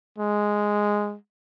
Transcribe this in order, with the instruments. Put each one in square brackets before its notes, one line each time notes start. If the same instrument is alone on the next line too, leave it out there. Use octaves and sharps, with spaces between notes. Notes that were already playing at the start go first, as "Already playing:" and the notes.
[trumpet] G#3